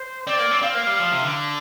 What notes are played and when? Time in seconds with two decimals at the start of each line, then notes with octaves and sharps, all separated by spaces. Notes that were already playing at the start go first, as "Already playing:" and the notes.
Already playing: C5
0.27 C4 D5
0.39 A#3
0.51 C4
0.62 C4 F5
0.75 A#3
0.87 G3
0.99 F3
1.11 C3
1.22 D3